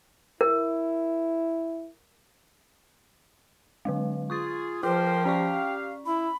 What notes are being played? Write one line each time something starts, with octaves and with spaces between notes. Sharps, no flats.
E4 A#4
D3 F#3 G#3
F4 G#4 C#6 D#6 A6
F3 F4 G#4 A#4 C5 G5
C#4 G4 D5 F5 C#6
E4 B5